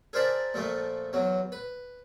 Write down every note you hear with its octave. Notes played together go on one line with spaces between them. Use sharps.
G#4 A#4 C5 D5 E5 A5
A#2 F3 A3
E2 F#3
B4